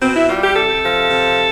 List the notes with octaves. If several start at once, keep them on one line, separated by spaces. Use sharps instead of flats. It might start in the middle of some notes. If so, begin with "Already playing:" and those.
B2 C4
E4
G3 F4
G4
C3 A4
F3
C3